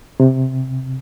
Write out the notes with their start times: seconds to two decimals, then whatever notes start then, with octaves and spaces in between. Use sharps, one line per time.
0.20 C3